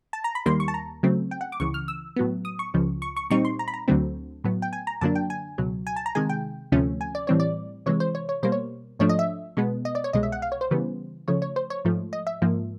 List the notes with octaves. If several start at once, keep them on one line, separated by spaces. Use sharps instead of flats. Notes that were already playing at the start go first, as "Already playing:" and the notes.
A5
A#5
B5
D#2 D#3 G3 A#3 C6
C#6
A5
A#5
C#3 F#3 A3 C4
G5
F#5
D6
C#2 C#3 E3 C#6
F6
E6
A2 F#3 B3
D#6
C#6
C#2 C#3 F3
C#6
C#6
A#2 G3 C4 D#4 C#6
C6
A#5
B5
A#5
D2 D3 F#3 A3 C4
A2 F#3 B3
G5
G#5
A#5
F#2 D3 F#3 A#3 D4 A5
G5
G#5
C#2 B2 F#3
G#5
A5
A#5
C3 D#3 G#3 G#5
G5
D2 C3 F3 A3 C#4
G#5
D5
A2 E3 G3 C4 C#5
D5
C3 E3 G#3 C#5
C5
C#5
C#5
B2 G3 A#3 C5
C#5
G#2 F3 A3 D4 C#5
D#5
E5
B2 G#3 B3
D#5
D5
C#5
C2 B2 G#3 D#5
E5
F#5
F5
C#5
C5
C#3 E3 G3 B3
C#3 F3 A3 C#5
C#5
C5
C#5
G#2 F3 A3
D#5
E5
G#2 F3 A#3